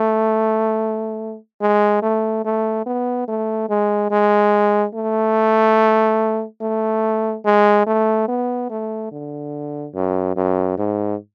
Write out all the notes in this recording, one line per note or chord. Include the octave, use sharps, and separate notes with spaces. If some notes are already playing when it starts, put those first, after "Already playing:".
Already playing: A3
G#3
A3
A3
B3
A3
G#3
G#3
A3
A3
G#3
A3
B3
A3
D3
F#2
F#2
G#2